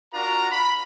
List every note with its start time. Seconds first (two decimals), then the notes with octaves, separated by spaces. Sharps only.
0.13 D4 F4 F#4 A#4 A#5
0.51 B5